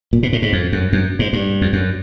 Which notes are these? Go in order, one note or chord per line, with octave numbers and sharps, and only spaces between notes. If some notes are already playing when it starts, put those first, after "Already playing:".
A#2
B2
A2
G#2
F2
F#2
F#2
G#2
G2
F2
F#2